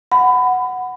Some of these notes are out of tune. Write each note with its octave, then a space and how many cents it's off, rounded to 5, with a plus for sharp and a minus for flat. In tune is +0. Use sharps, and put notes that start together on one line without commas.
F#5 +0 B5 +25